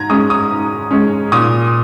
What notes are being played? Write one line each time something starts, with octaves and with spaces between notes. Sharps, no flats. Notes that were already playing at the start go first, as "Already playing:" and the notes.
Already playing: G#2 A#5 G#6
G#3 C#4 D#6
D#6
G#2
G#3 C#4
A#2 D#6